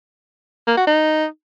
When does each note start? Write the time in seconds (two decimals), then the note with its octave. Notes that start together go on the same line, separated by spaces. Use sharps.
0.67 A#3
0.77 F#4
0.87 D#4